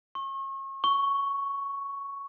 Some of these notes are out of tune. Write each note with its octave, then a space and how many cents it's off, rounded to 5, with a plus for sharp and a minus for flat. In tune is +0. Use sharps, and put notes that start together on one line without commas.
C#6 -35
C#6 +5